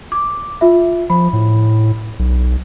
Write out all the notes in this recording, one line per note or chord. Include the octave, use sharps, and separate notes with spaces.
D6
F4 E5
F3 B5
A2
B1